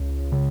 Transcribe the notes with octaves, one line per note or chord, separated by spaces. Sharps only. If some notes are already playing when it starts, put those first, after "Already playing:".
Already playing: C#2
C#3